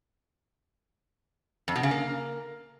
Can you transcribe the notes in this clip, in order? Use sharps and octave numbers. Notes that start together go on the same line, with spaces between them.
F2
B2
C#3
A#3